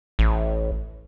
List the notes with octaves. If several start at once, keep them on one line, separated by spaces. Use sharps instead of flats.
A1